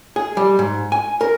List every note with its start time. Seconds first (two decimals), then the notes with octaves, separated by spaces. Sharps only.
0.16 G#4
0.37 G3
0.59 G#2
0.92 G#5
1.21 A#4